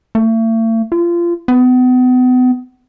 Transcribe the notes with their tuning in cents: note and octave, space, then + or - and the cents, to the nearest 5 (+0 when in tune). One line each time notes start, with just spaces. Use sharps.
A3 +40
F4 -25
B3 +35